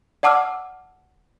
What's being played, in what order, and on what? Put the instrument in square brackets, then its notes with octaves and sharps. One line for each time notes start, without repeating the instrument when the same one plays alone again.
[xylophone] D5 F#5 A5 D6 E6 F6